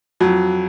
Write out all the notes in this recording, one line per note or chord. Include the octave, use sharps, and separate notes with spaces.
F2 F#3